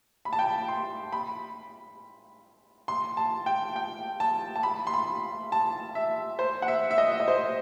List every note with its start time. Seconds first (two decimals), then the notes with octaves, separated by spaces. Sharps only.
0.25 B5
0.33 A5
0.39 G5
0.46 A5
0.68 C6
1.12 B5
2.88 C6
3.17 A5
3.46 G5
3.76 G5
4.20 A5
4.56 A5
4.63 B5
4.87 C6
4.94 B5
5.52 A5
5.95 E5
6.39 C5
6.62 F#5
6.68 E5
6.91 E5
6.98 D#5
7.12 E5
7.20 D#5
7.28 C5